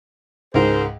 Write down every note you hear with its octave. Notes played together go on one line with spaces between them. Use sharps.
C#2 G#2 G#4 A#4 C5